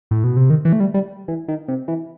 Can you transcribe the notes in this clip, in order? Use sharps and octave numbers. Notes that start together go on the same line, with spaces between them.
A2
B2
C3
D#3
E3
A3
G3
G3
E3
D#3
C3
E3